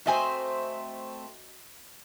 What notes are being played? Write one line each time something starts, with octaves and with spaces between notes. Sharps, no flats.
A3 C4 F#4 C5 D#5 G#5